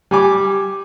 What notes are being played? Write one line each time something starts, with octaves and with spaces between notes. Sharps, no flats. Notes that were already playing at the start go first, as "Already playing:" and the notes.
G3 G#5 D6